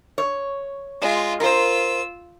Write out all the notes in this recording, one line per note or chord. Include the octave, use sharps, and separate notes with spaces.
C#5
G#3 F4
F4 A#4 C5 E6